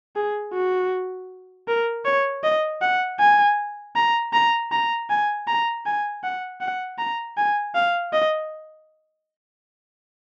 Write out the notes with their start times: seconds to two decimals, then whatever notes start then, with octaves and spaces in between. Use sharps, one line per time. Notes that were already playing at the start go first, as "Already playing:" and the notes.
0.16 G#4
0.54 F#4
1.68 A#4
2.05 C#5
2.44 D#5
2.82 F#5
3.20 G#5
3.96 A#5
4.33 A#5
4.72 A#5
5.10 G#5
5.47 A#5
5.86 G#5
6.23 F#5
6.61 F#5
6.99 A#5
7.37 G#5
7.75 F5
8.13 D#5